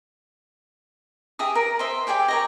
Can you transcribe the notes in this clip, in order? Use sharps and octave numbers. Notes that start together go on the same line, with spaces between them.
G4 G#4 E5 D#6
A#4
C5 D#5 E5
G4 G#4 D5 G5
A#4 C#5 D#5